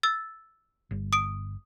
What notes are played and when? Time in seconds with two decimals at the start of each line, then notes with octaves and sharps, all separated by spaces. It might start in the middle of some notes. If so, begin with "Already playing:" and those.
0.03 E6 A6
0.91 G1
1.13 D#6 D7